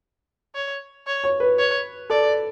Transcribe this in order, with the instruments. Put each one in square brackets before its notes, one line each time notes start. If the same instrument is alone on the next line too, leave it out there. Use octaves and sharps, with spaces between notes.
[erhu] C#5
C#5
[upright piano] C#5
B4
[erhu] C#5
[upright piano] A4 [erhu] D5